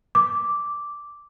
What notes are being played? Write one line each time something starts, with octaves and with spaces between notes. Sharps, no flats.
D6